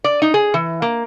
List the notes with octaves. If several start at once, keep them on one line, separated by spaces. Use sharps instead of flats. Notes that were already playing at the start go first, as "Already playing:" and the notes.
D5
D#4
G#4
E3
A#3